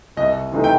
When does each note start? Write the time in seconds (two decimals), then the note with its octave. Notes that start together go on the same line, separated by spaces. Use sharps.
0.17 C2 D#5
0.52 C3 E3 A3 D#4
0.64 G5